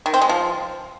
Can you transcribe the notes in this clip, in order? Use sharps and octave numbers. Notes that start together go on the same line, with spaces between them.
D#3
C4
G#3
F3